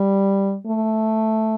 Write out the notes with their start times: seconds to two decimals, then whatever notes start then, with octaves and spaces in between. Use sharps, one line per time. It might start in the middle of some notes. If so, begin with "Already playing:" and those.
Already playing: G3
0.67 A3